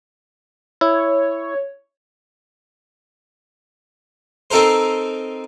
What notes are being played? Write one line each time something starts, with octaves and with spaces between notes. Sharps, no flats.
E4 C#5
C4 D#4 A4 A#4 C5